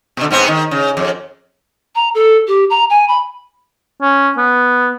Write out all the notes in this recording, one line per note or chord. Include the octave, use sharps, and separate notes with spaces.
B2 D3
G#2 B3 C4
D#3
C#3
F2
A#5
A4
G4
A#5
G#5
B5
C#4
B3